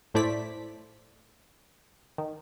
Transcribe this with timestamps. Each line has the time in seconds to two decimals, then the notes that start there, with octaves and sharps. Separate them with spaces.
0.14 A2 A3 E4 C5 D5 B6
2.18 D#3